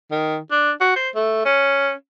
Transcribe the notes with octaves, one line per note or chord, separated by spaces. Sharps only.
D#3
D4
F#4
C5
A3
C#4